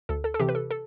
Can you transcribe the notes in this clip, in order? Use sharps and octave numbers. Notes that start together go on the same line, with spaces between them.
D2 A4
A4
A4
C3 E3 G4
B4
A4
A4